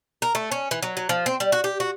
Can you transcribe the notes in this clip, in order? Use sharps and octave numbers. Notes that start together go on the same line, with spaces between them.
A#4
A3
C#4
E3
F#3
F#3
F3
C4
G3
F#4
G4
F#4